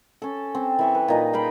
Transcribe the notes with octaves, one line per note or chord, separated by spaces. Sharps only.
C#4 A4
C4
E3 E5 C#6
B4
A#2 D#4 D#5
G#4 F5 G5 B5